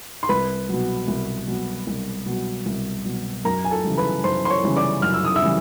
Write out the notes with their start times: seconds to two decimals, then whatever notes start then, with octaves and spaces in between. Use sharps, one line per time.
0.23 C6
0.29 C2 B4 B5
0.69 B2 F#3
1.08 C2
1.48 B2 F#3
1.87 C2
2.26 B2 F#3
2.66 C2
3.05 B2 F#3
3.45 F#2 A#4 A#5
3.65 G#5
3.71 A4 A5
3.84 C#3 E3 G3
3.97 B4 B5
4.24 F#2 C5 C6
4.45 C6
4.50 C#5 C#6
4.63 C#3 E3 G3
4.77 D5 D6
5.02 F#2 F6
5.14 E6
5.25 D#6
5.36 E5 E6
5.42 C#3 E3 G3